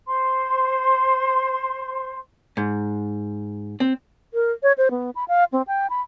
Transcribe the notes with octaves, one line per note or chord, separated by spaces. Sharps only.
C5 C6
G#2
C4
A#4
C#5
C5
B3
B5
F5
C4
G5
B5